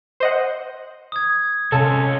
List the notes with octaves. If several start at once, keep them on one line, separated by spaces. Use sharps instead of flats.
C5 D#5 F#5
D#6 G#6
C3 C#4 F4 A4 A5